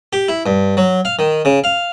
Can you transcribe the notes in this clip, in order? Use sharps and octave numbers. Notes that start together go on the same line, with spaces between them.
G4
E4
G2
F#3
F5
D#3
C#3
F5